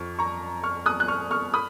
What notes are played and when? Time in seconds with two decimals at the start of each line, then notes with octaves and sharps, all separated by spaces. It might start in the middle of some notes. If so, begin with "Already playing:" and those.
Already playing: F2 F3 C#6 F6
0.19 A#5 C#6
0.63 C#6 F6
0.86 D#6 F#6
1.00 F#6
1.08 C#6 F6
1.31 C#6 F6
1.54 B5 D#6